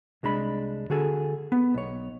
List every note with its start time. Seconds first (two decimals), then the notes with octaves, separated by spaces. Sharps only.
0.23 C2 G#3 D4 B5
0.90 D3 F#4 G#4 A4
1.52 B3
1.74 B1 C#5